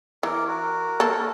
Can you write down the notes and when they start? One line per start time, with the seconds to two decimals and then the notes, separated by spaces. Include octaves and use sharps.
0.23 E3 A#4 D6
0.47 F#4 A#4
1.00 A#3 A4